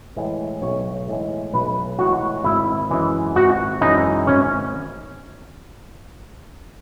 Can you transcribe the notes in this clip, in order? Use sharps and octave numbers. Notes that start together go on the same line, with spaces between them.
A2 E3 G#3
B1 C#5
A2 E3 G#3
B1 B4
A2 E3 G#3 F#4
G#1 E4
F#2 E3 G#3
G#1 F#4
F#2 E3 G#3 D#4
G#1 C#4